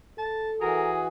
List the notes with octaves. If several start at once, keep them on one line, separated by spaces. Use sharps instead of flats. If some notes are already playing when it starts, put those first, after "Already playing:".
A4 A5
E3 F#4 G#4 A#4